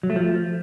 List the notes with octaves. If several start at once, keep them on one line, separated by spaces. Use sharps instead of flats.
F#3
A3
F3